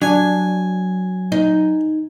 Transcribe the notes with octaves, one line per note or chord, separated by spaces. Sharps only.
F#3 D4 G#5
D#4